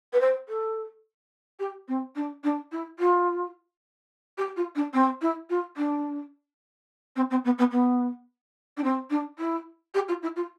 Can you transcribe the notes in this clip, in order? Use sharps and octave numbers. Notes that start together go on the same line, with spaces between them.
B4
C5
A4
G4
C4
D4
D4
E4
F4
G4
F4
D4
C4
E4
F4
D4
C4
C4
B3
B3
B3
D4
C4
D4
E4
G4
F4
E4
F4